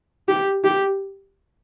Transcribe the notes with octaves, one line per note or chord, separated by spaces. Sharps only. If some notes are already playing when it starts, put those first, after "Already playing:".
G4
G4